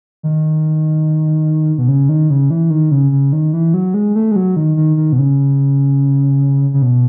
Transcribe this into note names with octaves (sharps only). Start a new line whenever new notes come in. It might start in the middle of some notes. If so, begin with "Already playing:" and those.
D#3
B2
C#3
D#3
C#3
E3
D#3
C#3
C#3
D#3
E3
F#3
G#3
A3
G#3
F#3
D#3
D#3
D#3
B2
C#3
C#3
B2